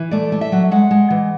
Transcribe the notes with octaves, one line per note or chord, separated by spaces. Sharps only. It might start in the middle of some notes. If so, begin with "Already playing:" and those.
Already playing: E3
A3 D5
A3
E5
F#3
G#3 F#5
G#3
E3